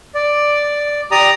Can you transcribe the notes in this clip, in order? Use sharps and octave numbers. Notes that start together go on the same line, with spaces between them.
D5
G4 D5 A#5 D#6